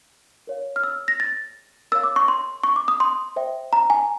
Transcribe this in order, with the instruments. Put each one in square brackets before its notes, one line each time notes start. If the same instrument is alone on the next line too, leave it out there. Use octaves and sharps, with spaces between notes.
[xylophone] A#4 C#5 F5
F6
E6
A#6
A6
A#4 C#5 F5 E6
D6
C#6
C6
C#6
D6
D#6
C6
C5 E5 G5
A#5
G#5